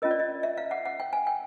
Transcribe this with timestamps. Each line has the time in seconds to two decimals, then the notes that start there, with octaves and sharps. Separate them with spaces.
0.02 C#4 F4 A#4 D#5
0.11 D5
0.19 D#5
0.43 E5
0.57 F5
0.71 F#5
0.86 F#5
1.00 G5
1.13 G#5
1.27 G5